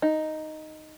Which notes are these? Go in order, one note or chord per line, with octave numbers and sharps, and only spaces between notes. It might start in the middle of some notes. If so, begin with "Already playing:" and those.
D#4